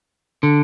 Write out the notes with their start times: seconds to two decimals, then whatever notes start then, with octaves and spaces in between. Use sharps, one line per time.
0.43 D3